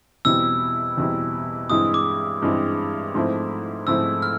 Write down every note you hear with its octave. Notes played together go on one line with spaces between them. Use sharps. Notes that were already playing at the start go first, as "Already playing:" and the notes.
E2 B2 G3 C4 E4 E6
E2 B2 G3 C4 E4
G2 E3 G#3 C4 E4 D#6
D6
G2 E3 G#3 C4 E4
G#2 F3 A3 C4 E4
G#2 F3 A3 C4 E4 E6
F6